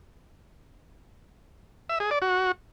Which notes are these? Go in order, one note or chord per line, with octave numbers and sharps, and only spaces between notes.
E5
G#4
D5
F#4